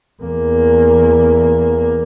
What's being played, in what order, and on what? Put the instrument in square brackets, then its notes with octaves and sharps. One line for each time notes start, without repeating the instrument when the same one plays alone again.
[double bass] E2 A#3